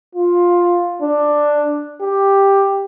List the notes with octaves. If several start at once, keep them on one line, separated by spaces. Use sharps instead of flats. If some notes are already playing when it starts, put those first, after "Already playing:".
F4
D4
G4